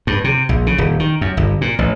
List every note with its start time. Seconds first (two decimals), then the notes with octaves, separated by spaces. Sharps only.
0.07 G2
0.24 C3
0.49 A#1
0.67 C#3
0.78 D#1
1.00 D#3
1.21 F#2
1.37 G1
1.61 A#2
1.79 A1